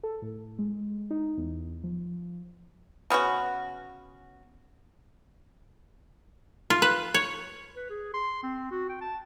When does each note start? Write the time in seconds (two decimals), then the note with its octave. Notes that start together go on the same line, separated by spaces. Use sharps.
0.03 A4
0.22 A2
0.59 G#3
1.11 D#4
1.37 E2
1.84 F3
3.10 C#3 B3 C#4 F#4
6.70 F4
6.82 B4
7.14 C#5
7.76 B4
7.90 G#4
8.14 C6
8.43 C4
8.71 F#4
8.89 G5
9.01 A5